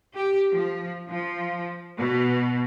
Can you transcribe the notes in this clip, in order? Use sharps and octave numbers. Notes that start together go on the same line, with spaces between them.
G4
F3
F3
B2